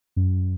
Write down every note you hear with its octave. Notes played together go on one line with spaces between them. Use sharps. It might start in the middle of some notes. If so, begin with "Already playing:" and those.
F#2